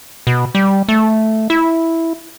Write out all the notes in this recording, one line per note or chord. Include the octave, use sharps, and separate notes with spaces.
B2
G3
A3
E4